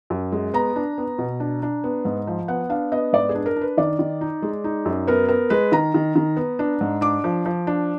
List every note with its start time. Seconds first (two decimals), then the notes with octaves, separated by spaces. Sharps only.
0.10 F#2
0.32 G#3
0.53 B3 A#5
0.76 D4
0.98 B3
1.18 B2
1.40 D4
1.63 D4
1.84 B3
2.05 G#2
2.27 F3
2.48 B3 F#5
2.69 D4 F5
2.92 B3 D#5
3.13 G#2 D5
3.29 G#4
3.35 D4
3.46 A#4
3.56 D4
3.61 B4
3.77 D#3 D5
3.99 D#3
4.21 D#4
4.42 G#3
4.64 D#4
4.85 F#2
5.07 B3 A#4
5.28 B3 A#4
5.50 G#3 B4
5.72 D#3 A#5
5.94 D#3
6.16 D#3
6.36 B3
6.59 D4
6.81 G#2
7.01 D4 D6
7.24 F3
7.46 F3
7.67 D4